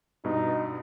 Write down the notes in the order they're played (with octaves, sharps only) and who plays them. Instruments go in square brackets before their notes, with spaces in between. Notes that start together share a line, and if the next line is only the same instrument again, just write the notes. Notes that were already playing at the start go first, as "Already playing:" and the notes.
[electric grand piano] G2 B2 [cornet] D#4